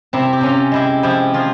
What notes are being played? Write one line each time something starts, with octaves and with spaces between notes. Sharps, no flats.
C3 C4 E4
G4
C3 C#4 F4
G#3 E4 G4
F3 E4 G4
F3 F4 G#4